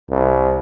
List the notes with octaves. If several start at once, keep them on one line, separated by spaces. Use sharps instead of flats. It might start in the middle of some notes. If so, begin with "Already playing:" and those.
C2